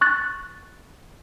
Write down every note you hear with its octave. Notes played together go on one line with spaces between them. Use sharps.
C#6 F#6 A6